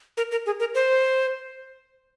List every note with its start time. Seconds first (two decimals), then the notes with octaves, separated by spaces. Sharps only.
0.17 A#4
0.31 A#4
0.46 G#4
0.60 A#4
0.75 C5